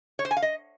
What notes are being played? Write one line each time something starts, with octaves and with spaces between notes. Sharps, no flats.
C#5
C5
G#5
F5
D#5